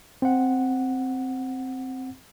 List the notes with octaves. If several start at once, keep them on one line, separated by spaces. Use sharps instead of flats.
C4 F#5